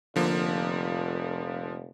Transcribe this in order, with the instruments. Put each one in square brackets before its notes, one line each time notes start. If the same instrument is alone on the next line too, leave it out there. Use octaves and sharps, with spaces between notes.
[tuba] F1 [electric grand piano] D3 F3 A#3